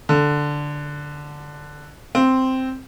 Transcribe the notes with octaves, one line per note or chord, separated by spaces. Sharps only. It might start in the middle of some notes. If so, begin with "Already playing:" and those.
D3
C4